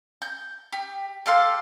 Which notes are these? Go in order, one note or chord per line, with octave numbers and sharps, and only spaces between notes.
G6
G4
G4 A4 F5 C6